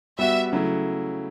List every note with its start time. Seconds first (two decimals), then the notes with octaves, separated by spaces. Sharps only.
0.19 G3 B3 F#4 E5
0.52 C#3 F#3 A3 E4